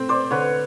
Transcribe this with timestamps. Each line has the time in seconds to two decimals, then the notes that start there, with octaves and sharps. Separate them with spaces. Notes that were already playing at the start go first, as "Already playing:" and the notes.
Already playing: A3 C4
0.09 C5 D5
0.31 D3 B4 C#5